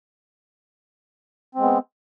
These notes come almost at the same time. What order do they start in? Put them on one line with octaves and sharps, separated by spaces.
C4 G#3 B3